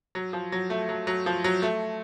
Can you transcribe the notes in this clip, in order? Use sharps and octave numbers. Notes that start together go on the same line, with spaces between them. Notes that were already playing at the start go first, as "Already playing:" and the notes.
F#3
F3
F#3
A3
F#3
F#3
F3
F#3
A3